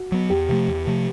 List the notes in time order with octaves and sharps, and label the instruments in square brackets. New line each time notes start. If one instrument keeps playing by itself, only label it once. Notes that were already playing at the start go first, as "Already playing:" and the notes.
Already playing: [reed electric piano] F#4
[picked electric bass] F#3 B3
[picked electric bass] E2 [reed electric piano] G4
[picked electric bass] C3 F3 A3
E2
C3 F3 A3